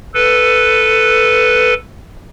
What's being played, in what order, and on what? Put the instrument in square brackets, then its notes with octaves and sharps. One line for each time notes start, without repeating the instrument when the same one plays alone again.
[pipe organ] A4 B4